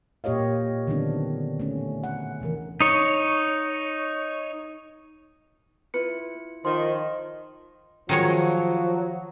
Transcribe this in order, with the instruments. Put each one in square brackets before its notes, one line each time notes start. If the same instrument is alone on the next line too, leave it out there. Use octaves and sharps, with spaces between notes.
[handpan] A#2 A#3 G4 C#5 D#5 F5
D3 D#3 F#3 B3 C4 D4
A3 C#4
F#5
C3 D#3 E3 A#4
[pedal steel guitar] D#4 C#5
[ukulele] E4 F4 B4 [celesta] C#7
[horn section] D#3 [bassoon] F3 [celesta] C6
[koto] D#3 G#3 C#5 [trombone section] F3 F#3